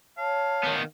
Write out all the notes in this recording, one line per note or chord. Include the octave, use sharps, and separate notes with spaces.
C#5 F5 A5
D#3 B3